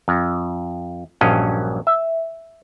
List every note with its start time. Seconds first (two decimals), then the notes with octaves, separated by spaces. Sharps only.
0.08 F2
1.21 A#1 G2 F#3 C#4 D#5 F5
1.87 E5